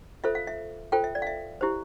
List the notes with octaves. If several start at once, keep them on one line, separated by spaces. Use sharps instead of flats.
F4 A4 C5 E5
F5
E5
F4 A4 C5 G5
E5
D5
F5
E5
E4 G4 C5